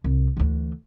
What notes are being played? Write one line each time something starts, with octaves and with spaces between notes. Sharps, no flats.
C2
D2 E3